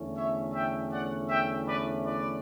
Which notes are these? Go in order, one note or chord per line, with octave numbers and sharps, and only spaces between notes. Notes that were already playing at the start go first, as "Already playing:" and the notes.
Already playing: E2 D3 A3 C#4
C#5 E5
E5 G5
D5 F#5
E5 G5
B4 D5
B4 D5